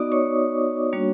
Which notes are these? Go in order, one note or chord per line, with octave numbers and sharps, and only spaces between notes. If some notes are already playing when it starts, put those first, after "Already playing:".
Already playing: B3 D#4 F#4 D5 D#5 D6 D#6
C#5 C#6
G3 A#3 D4 F#4